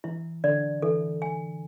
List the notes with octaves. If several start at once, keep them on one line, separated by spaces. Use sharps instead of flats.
E3 E4
D3 D5
E3 A4
G#5